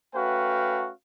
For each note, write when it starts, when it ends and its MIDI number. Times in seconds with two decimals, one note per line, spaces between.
0.15 0.91 57
0.15 0.91 61
0.15 0.91 66
0.15 0.91 71
0.15 0.91 77
0.15 0.91 79